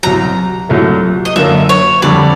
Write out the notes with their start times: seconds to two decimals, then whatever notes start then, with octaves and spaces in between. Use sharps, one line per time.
0.03 C2 B2 F#3 A#5
0.69 C2 A#2 F#3 A3
1.25 D#5
1.36 F#2 D3 F#3 A#3 E5
1.69 C#5
2.02 F2 D3 G3 D5